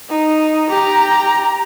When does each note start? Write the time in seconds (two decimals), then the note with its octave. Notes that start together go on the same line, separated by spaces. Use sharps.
0.10 D#4
0.70 G4 A#5